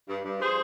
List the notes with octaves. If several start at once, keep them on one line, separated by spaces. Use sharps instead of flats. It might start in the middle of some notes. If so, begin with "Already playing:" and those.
G2
G2
F3 G#4 C5